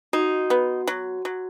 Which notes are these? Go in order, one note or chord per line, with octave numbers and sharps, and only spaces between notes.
D#4 F#4
B3
F#3
F#3